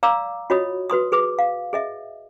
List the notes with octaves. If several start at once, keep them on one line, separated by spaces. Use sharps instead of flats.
D5 F5 A#5 D6 E6
F4 F#4 C#5 D#5 B5 D#6
F#4 B4 C6 D#6
G#4 B4 D6
F5
G#4 D#5 E5